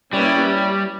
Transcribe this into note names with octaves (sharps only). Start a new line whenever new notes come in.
G3 A#3 C#4 E4 G4 B4